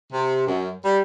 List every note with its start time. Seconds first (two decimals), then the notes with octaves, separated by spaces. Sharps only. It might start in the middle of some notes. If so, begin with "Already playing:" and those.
0.13 C3
0.47 F#2
0.84 G3